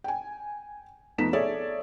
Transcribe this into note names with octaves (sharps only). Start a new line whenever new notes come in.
G5 G#5
F2 A3 B3 D#4 B6 E7
G#4 A4 C#5 D5 E5